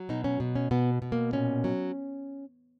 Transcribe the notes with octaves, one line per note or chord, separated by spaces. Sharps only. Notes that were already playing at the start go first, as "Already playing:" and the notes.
Already playing: F#3
B2 D#4
C#4
B2
C#4
B2 B3
B2
A#3
A#2 C#4
F#3